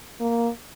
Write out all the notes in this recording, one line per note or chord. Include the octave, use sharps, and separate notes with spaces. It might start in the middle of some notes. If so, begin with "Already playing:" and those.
A#3